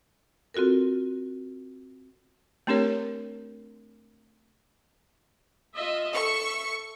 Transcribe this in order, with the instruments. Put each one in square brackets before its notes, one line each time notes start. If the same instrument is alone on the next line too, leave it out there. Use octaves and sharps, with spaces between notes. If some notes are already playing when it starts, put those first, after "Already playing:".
[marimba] C4 F4 F#4 A4 A#4
[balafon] A3 C4 D4 G4 A#4 C#5
[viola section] F4 D#5 E5
[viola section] A4 E5 [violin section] C#6